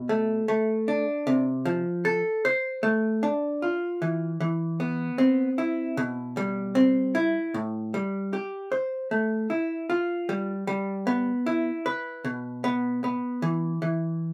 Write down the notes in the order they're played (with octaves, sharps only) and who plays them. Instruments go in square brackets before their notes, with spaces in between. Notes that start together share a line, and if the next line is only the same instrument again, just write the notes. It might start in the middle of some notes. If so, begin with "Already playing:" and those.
Already playing: [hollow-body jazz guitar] B2
A3
A3
D4
C3
F3
A4
C5
A3
D4
F4
E3
E3
B3
C4
E4
B2
G3
C4
E4
A2
G3
G4
C5
A3
E4
F4
G3
G3
B3
E4
B4
B2
B3
B3
E3
E3